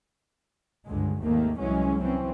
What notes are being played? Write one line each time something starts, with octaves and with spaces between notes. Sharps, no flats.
C#2 G2 D3 G#3
G#1 D#2 D#3 A3 A#3
C2 E3 F#3 G#3 C#4
E3 C4 C#4